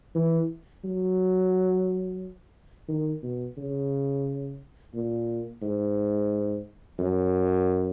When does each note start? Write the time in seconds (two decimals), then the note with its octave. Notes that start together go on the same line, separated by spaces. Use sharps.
0.15 E3
0.84 F#3
2.89 D#3
3.23 B2
3.58 C#3
4.95 A#2
5.62 G#2
6.99 F#2